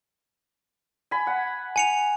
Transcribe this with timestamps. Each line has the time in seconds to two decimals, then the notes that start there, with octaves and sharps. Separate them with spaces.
1.11 G#5 B5
1.27 F#5
1.76 G#5 C#7 F7